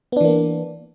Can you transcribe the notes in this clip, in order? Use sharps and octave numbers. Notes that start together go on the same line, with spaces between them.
E3 A#3 B3 D4